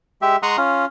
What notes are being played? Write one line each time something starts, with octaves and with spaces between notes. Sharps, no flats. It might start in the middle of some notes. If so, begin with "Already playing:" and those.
G#3 G4 E5
G#3 F#5 A#5 C6 C#6 D#6
C#4 F4